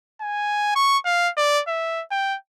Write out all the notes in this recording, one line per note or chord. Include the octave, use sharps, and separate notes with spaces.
G#5
C#6
F5
D5
E5
G5